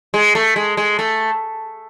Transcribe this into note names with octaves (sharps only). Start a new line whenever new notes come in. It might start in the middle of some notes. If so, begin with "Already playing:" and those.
G#3
A3
G#3
G#3
A3